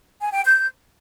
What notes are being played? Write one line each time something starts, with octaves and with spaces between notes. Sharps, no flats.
G#5
G5
G6